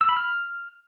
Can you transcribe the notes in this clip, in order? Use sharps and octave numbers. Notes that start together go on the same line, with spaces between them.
E6
B5
F6